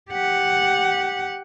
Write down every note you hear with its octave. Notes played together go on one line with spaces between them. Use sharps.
G4 F#5